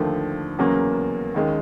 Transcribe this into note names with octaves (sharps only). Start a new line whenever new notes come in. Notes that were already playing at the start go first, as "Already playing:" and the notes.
Already playing: D#2 D3 F3 A3
E2 C#3 F#3 A#3 C#4
D#2 D#3 G#3 C#4